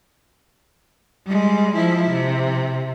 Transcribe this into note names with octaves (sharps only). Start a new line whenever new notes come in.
G3 G#3
F3 E4
C3